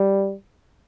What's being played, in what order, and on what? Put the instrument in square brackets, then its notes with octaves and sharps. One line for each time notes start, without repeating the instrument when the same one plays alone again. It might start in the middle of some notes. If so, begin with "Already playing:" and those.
Already playing: [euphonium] G3